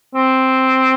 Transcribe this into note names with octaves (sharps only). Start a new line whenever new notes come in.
C4